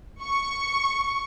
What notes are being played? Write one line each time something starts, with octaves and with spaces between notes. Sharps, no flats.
C#6